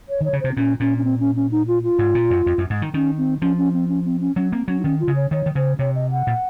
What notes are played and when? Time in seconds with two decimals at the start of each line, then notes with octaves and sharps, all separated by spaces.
0.09 C#5
0.21 D#3 C#5
0.33 C#3
0.40 C3 C5
0.51 C4
0.56 A#2 C#4
0.80 A#2 C#4
0.98 C#4
1.04 C4
1.20 C#4
1.36 C#4
1.51 D#4
1.67 F4
1.83 F4
1.99 G#2
2.15 A#2
2.31 F#2
2.46 F2
2.58 F#2
2.70 G#2
2.82 D#3
2.94 D#3 C#4
3.18 C4
3.41 F3 C#4
3.58 C#4
3.73 C4
3.88 C#4
4.05 C4
4.21 C#4
4.36 F#3 C#4
4.52 A#3 C4
4.68 F#3 C#4
4.80 D#4
4.84 D#3 C#4
5.00 F4
5.08 C#3
5.16 C#5
5.31 D#3 C#5
5.46 D#3
5.55 C#3 C5
5.79 C3 C#5
5.95 D#5
6.11 F#5
6.27 A#2